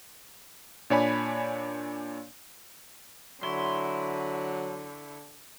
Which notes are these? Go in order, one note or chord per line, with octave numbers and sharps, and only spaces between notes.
A#2 D4 C#5 D5 G#5 B5
D3 F#3 E4 C#5 C6